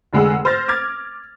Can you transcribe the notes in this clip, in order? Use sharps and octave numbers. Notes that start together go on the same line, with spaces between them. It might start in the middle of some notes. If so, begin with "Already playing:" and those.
F1 D3 G#3 G#4 F#5 E6
C5 F6 A6 A#6
D6 F6 G#6 A6